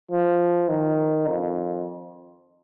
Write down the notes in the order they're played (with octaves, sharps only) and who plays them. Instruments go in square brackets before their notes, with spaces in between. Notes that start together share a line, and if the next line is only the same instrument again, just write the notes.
[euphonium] F3
D#3
F2